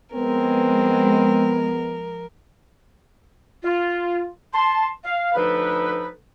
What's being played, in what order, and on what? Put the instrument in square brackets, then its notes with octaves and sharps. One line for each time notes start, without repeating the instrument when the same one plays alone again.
[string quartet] F3 A#4 [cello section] G#3 [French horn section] B3 [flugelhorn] C4
[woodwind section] F4
A5 C6
F5
D2 F3 D#4 A4 B4